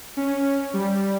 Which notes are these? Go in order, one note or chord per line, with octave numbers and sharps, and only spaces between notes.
C#4
G3